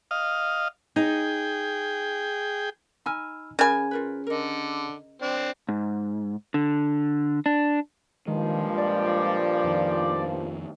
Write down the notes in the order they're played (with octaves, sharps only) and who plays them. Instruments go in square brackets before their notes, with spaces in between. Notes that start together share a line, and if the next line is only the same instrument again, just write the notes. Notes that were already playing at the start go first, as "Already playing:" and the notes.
[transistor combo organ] D#5 F5
[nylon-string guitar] D#4 [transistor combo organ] G#4 G5
[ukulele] D#4 G#5 [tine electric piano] B5 E6 F6
[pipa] C#3 G#5 [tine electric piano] C#4 G#4 [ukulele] A#4 A5 B5
[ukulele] F4 A#4 B4
[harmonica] D3 [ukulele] A#4 D#5
[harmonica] C4 D4
[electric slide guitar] G#2
D3
D4
[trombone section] G2 A#2 F3 [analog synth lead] D#3 [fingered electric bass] G#3
[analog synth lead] D5
[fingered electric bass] F2 D#3